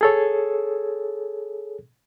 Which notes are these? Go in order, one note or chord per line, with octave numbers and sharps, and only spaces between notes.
G#4 A4 C#5